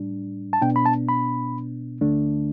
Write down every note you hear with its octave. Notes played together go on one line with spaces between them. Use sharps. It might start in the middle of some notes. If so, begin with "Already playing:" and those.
Already playing: A2 G3 D4
A5
B2 B3 D4 G5
B5
A5
B5
D2 D3 A3 D4